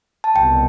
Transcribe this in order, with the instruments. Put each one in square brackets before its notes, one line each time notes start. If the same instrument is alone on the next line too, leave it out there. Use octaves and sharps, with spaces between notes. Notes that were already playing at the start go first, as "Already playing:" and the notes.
[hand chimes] A5
[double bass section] C2 B2 [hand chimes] G5